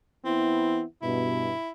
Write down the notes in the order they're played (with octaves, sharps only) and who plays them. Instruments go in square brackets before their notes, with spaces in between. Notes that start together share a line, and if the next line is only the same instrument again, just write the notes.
[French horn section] E3 B3 E4 [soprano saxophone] C4
[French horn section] G2 B2 [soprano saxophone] E4